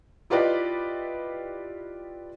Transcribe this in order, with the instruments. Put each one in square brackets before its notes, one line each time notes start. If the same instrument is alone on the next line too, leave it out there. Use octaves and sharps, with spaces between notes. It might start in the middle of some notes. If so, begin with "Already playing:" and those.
[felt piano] E4 F4 G4 B4 D5 D#5